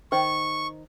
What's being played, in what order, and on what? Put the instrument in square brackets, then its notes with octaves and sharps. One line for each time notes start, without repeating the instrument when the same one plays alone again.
[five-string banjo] D#3 C5 [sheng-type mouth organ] C#6